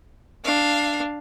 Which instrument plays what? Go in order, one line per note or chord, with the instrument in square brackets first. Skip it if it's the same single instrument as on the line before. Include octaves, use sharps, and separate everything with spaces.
[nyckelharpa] D4 [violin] F5